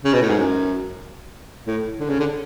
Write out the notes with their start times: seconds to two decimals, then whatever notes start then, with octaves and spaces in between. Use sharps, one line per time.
0.04 C#3
0.13 B2
0.21 A2
0.30 G#2
0.38 F#2
1.67 A2
2.00 D3
2.09 C#3
2.19 D3